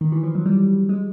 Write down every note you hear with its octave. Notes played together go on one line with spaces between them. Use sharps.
D#3
E3
F3
F#3
G3
G#3